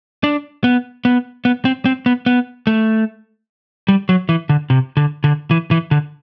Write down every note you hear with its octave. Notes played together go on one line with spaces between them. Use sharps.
D4
B3
B3
B3
C4
C4
B3
B3
A3
G3
F#3
E3
D3
C3
D3
D3
E3
E3
D3